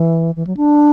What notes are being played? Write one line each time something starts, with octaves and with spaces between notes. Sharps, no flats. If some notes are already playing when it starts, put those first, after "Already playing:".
Already playing: E3
E3
F#3
D4